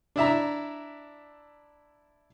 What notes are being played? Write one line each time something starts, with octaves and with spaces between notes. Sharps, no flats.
D4 E4 E5 A#5